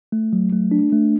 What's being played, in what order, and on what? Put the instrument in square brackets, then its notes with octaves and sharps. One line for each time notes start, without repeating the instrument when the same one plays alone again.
[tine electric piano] A3
F#3
A3
D4
A3